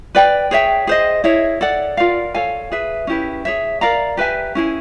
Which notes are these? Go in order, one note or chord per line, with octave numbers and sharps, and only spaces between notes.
B4 D5 G5
G#4 C#5 E5 G5
G#4 C5 D#5
E4 G#4 C#5 E5
A4 D5 F#5
F4 A#4 D5 F5
A4 C#5 F5 G#5
G#4 B4 E5
C#4 E4 G4 B4
G#4 C#5 E5
A#4 D5 F5 A#5
G4 B4 E5 G#5
C#4 E4 G#4